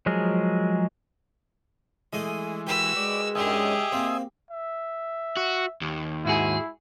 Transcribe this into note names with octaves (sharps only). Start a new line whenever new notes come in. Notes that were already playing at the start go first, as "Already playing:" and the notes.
F3 F#3 G#3 G#4 A#4
E3 G#3 A3 G#4 D#5
F#4 G4 A#4 B4 E6
G#3 D5
F#2 D3 D#3 G4 G#4 D#5 E5 G#5
A#3 C4
E5
F#4
D#2
G#2 E4 F#4 G#4